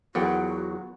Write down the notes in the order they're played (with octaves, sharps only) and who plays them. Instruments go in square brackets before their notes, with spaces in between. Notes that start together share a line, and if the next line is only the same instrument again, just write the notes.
[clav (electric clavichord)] E2 [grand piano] F#3 F4 [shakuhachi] F#4 [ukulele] A#4 F#5 G5